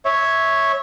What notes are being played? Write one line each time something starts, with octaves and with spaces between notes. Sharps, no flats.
C#5 E5